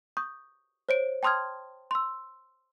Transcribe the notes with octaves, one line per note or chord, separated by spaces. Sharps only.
C#6 D#6 G6
C5 C#5 D7
G5 A5 C6 D#6 F6 G#6
C6 E6